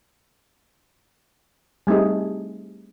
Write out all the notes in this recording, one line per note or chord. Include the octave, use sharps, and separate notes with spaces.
G3 A3 C4 D#4 G#4